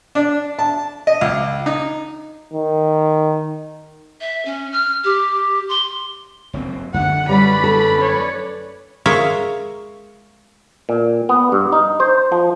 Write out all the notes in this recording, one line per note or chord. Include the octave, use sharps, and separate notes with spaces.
D4
A5
D#5
C#2
D#4
D#3
E5
C#4
F6
G4
C6
F#1 F#3 C4
F#2 D3 A3 F#5
G3 C#4 B4 D5 B5
A4
C#5
G#3 A#4 C#5 E5 F5
A#2
B3
G2
D#4
C5
F3